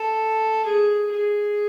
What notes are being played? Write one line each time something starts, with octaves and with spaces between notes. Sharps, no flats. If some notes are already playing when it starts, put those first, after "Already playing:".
Already playing: A4
G#4
G#4